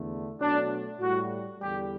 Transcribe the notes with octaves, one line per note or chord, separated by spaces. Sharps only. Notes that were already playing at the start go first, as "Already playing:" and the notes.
Already playing: E2 D3 A3
B2 F#3 A3 D4
A2 G3 F#4
E2 D3 G3 G4